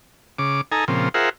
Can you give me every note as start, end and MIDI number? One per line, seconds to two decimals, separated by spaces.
0.39 0.61 49
0.39 0.61 86
0.72 0.85 63
0.72 0.85 69
0.72 0.85 80
0.72 0.85 82
0.88 1.09 46
0.88 1.09 49
0.88 1.09 53
0.88 1.09 60
1.14 1.29 65
1.14 1.29 68
1.14 1.29 70
1.14 1.29 72
1.14 1.29 76
1.14 1.29 78